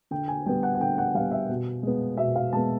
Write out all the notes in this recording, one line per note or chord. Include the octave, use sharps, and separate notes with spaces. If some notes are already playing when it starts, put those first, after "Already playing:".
D3 G5
G#5
G3 B3 G5
F#5
F#5
D3 G5
F#5
G3 B3 F5
E5
B2
G#3 B3
B2 E5
F5
G#3 B3 A5